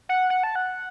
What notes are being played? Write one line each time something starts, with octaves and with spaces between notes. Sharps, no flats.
F#5
F#5
A5
F#5